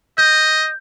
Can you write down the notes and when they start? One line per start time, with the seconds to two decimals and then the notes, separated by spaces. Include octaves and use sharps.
0.18 D#5 G6